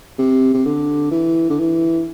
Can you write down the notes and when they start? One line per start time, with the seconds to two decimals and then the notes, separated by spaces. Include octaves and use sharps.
0.19 C3
0.54 C3
0.65 D3
1.11 E3
1.50 D3
1.59 E3